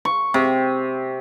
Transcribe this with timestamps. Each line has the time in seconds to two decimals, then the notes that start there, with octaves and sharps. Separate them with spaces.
0.05 C#6
0.34 C3